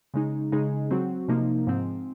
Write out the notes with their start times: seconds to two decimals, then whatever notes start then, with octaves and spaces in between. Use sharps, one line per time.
0.14 C#3 G#3 D#4
0.52 C#3 G#3 D#4 G#4
0.91 F#3 C4 F#4
1.28 C3 F3 A#3 D#4
1.67 G#2 F3 C4